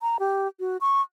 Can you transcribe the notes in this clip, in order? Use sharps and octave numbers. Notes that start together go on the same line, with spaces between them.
A#5
G4
F#4
C#6